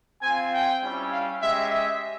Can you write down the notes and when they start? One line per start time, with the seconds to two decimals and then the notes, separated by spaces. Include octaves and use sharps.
0.22 C4 F4 G#5
0.52 G5
0.82 G3 C#4 E4
1.10 F5
1.41 G#3 C#4 G4 E5
1.69 E5